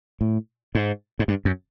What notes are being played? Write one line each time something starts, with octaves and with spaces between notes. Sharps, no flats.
A2
G#2
G#2
G2
F#2